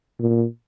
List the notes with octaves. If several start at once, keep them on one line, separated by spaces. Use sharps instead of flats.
A#2